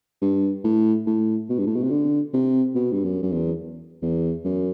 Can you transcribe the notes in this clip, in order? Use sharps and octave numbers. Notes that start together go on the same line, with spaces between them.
G2
A2
A2
B2
G2
A2
B2
C3
D3
C3
B2
G2
F#2
F#2
E2
E2
F#2